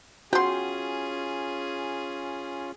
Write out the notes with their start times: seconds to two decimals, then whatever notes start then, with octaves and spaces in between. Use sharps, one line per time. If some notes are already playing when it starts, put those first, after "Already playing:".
0.33 C#4 F4 F#4 G#4 G5 C6